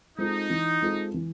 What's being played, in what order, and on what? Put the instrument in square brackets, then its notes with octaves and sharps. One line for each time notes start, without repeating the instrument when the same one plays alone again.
[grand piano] G#3 C4 F4 A4 [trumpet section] D#4
[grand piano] E3
G#3 C4 F4 A4
E3